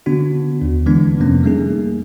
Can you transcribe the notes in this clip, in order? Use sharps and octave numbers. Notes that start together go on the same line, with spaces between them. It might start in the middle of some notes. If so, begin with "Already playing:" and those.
D3 B3 D4 F#4
D#2
D3 E3 G#3 B3 D4
F2 C3 F3 A3 A#3 C#4
G3 A3 A#3 D#4 G#4